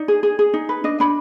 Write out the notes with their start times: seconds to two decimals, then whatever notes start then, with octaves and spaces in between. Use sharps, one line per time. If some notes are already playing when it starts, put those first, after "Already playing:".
Already playing: D#4 D5
0.08 G#4
0.23 G#4
0.39 G#4
0.54 D#4
0.69 B4
0.84 D4 D#5
1.00 D4 B5